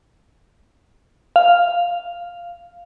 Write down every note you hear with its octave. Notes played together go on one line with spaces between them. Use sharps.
F5